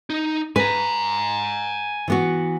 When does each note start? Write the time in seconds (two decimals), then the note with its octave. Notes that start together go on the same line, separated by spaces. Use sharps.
0.10 D#4
0.56 B4 G#5 A#5
2.08 E3 B3 F#4